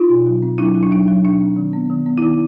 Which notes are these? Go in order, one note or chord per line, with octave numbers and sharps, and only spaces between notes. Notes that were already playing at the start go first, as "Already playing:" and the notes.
Already playing: D#4 F4
B2
F#3
C4
F#3 D4 E4
F#3
D4
F#3 D#4
F#3
B2 D4
C4
D#3
B3
D#3
B3
E4
D#3 D#4